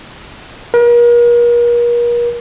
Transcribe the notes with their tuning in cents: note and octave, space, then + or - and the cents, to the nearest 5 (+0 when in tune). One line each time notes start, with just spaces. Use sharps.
A#4 +40